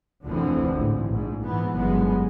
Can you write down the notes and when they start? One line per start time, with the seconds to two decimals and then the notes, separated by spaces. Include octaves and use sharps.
0.24 F1 D2 D3 E3 F3 C4
0.71 A1 G#2
1.08 A#1 G#2
1.43 G#2 E3 B3
1.73 G1 F#2 G#3 B3